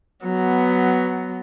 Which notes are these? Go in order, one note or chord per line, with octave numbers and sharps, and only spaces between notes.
F#3 B3